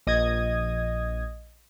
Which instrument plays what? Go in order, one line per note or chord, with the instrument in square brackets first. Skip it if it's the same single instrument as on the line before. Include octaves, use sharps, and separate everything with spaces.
[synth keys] A#1 D#5 D#6 G#6